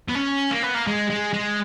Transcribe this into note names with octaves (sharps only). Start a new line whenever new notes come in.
B3
C#4
A#3
B3
A#3
G#3
G#3
G#3